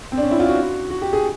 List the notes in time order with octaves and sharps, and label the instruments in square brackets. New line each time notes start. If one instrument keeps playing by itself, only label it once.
[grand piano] C4
D4
C#4
E4
F4
F#4
F#4
G4
G#4